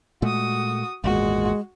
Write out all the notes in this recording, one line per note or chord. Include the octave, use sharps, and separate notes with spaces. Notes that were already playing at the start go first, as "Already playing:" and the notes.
A#2 G#3 A3 F#4 D#6
G#1 E2 A#2 G#3 F#4